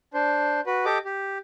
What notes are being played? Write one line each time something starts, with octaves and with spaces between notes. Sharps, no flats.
D4 C5
F#4 B4
G4 A4 D#5 D6
G4